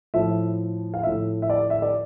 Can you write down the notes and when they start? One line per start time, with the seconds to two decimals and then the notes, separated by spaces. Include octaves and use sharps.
0.14 A2 F3 E5
0.94 F5
1.03 A2 F3 E5
1.42 E5
1.50 D5
1.70 E5
1.82 D5